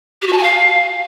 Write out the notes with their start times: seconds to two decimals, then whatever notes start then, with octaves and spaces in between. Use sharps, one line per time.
0.22 G4
0.27 F#4
0.32 A5
0.38 G#5
0.43 F5